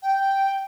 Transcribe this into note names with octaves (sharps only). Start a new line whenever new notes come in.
G5